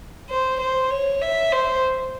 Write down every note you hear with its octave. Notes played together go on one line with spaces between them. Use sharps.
C5
C5
C#5
E5
C5